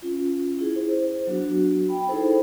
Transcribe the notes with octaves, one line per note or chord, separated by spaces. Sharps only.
C#4 F4
E4 G#4
C5
F#3 B3 D4 F#4
G5 B5
D#4 E4 G#4 A4 C5